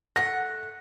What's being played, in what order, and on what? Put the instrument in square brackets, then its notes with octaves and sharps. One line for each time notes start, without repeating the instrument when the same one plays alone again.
[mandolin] A3 F#5 [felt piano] A#6